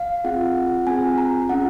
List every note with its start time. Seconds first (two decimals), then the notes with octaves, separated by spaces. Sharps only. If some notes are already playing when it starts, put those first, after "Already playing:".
Already playing: F5
0.24 C4 F4 G#4 F#5
0.87 C4 F4 G#4 G#5
1.18 A#5
1.49 C#4 F4 G#4 F#5